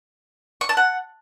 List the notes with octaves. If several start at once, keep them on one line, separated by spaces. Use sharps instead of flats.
C#6
A5
F#5